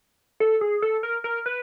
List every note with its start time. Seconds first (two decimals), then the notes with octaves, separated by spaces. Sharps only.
0.40 A4
0.61 G#4
0.82 A4
1.03 A#4
1.24 A#4
1.46 B4